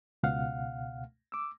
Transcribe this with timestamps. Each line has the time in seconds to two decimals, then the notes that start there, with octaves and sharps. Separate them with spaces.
0.23 C#2 B2 F5 F#5 F6
1.32 D6 E6